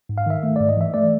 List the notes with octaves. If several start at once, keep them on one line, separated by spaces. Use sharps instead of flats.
G#2
F5
D#3 E5
A3
G#2 D5
D#5
E3 E5
A3 D5